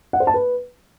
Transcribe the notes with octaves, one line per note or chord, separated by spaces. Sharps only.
F#5
C5
A5
B4